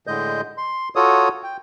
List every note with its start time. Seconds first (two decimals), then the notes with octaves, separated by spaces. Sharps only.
0.07 A2 D3 G#3 D#5 G6
0.58 C6
0.96 F4 F#4 A4 C#5 D#6
1.43 G5